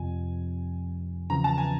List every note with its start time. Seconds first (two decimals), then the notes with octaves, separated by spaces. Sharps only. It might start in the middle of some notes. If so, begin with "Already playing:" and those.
Already playing: F2 C3 F3 G#5
1.30 E2 C#3 F3 A#5
1.44 A5
1.58 G#5